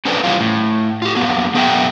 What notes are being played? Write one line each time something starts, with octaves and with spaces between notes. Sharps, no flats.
C#4 D4 A4 B4 C5 D5
E3 G3 A3 C#4 F4
A2
F4 G4
F#2 A#3 B3 G#4
F#2 B3 G#4 A#4 E5 G5